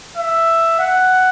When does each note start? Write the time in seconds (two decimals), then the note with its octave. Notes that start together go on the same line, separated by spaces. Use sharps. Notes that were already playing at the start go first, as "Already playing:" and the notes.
0.18 E5
0.79 F#5